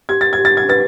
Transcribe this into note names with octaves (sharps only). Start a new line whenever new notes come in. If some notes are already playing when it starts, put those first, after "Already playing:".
G4 G#6
A6
G#6
G4
A6
G#6
B4 A6